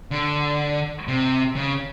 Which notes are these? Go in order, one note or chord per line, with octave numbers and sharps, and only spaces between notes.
D3
C3
C#3